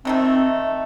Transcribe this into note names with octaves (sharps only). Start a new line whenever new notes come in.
C3 D#3 A3 C4